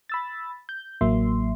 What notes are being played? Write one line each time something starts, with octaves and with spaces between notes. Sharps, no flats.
B5 E6 A6
G6
A1 F#3 A#3 E5 C6